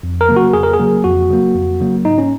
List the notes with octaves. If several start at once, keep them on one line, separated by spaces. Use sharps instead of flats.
F2
A#4
C#3 F#3 A#3
F#4
F2 G#4
A#4
G#4
C#3 F#3 A#3
F2 F#4
C#3 F#3 A#3
F2
C#3 F#3 A#3
G#2 D#4
C#4